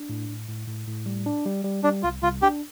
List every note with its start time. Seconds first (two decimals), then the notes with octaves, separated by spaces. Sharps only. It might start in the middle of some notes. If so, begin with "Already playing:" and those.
Already playing: D4
0.09 A2
0.29 A2
0.49 A2
0.67 A2
0.87 A2
1.06 G3
1.26 D4
1.46 G3
1.64 G3
1.83 G3 D4
2.03 C2 F4
2.22 C2 F4
2.42 D4 G4